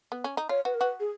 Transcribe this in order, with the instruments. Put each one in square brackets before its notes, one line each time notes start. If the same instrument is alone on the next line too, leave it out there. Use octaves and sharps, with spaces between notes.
[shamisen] B3
C#4
D#4
[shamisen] F4 [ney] C#5
[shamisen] F#4 [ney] B4
[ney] A#4
[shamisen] F#4 [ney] B4
[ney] G#4